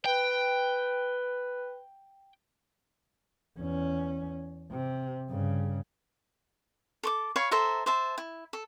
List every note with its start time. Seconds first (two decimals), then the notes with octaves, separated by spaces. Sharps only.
0.06 B4 G5
3.58 E2 C#4
4.71 C3
5.30 G2 C#3
7.03 A4 C#6 D6
7.36 C#5 F5 B5 C#6
7.51 A4 C5 E5 A#5
7.86 C5 E5 A5
8.18 E4
8.53 A4